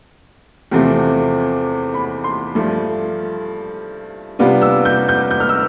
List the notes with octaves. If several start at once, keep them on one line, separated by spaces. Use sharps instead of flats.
E2 C3 F3 A3 C4
B5
C6
G2 F3 A3
C3 G3 B3 D4 F4
E6
G6
G6
G6
F6
E6